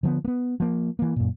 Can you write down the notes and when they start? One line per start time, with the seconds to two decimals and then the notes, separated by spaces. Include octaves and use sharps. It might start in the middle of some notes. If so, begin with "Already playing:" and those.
0.03 D3 F3 A#3 B3
0.24 A#3 B3
0.60 F3 A#3
0.99 E3 A#3
1.16 F#2 A#2